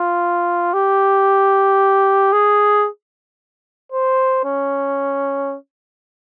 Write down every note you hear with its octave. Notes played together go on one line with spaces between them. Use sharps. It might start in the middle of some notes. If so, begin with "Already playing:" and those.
Already playing: F4
G4
G#4
C5
C#4